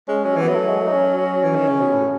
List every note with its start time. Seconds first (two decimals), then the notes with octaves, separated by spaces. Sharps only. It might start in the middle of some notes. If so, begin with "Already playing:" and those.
0.08 G#3 C#4
0.25 F#3 C#4
0.36 E3
0.42 B3
0.48 F#3
0.55 A3
0.68 G#3
0.80 A3
0.87 D#4
0.92 C#4
1.18 C#4
1.43 E3
1.56 D#3
1.68 C#3
1.81 B2
1.93 A2